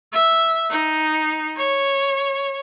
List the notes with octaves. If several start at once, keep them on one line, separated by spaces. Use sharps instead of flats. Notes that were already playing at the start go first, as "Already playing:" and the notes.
E5
D#4
C#5